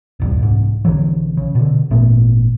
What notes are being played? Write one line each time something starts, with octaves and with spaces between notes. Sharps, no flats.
D#1 C2 G2
C2 G#2
B1 D3 E3 F#3
C#3
B2 D3
G#1 A#2 A3 B3